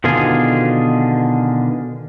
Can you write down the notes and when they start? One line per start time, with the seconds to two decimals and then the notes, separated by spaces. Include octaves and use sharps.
0.04 B2 D3 D#3 F4 G#4